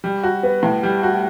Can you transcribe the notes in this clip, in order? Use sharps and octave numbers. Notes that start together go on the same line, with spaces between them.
G3
F#4
B3
A2
G3
F#4